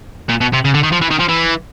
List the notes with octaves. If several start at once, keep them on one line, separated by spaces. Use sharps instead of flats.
A#2
B2
C3
C#3
D3
D#3
F3
E3
D#3
F3
E3